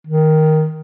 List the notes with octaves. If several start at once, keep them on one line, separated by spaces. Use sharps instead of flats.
D#3